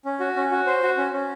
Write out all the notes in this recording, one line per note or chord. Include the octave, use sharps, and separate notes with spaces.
C#4
F#4
C#4
F#4
C5
F#4
C#4
C#4